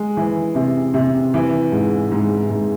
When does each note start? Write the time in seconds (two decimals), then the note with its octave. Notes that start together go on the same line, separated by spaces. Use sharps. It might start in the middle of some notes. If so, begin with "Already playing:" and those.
Already playing: G#3
0.17 E3
0.55 C3
0.94 C3
1.34 E3
1.72 G#2
2.12 G#2
2.50 G#2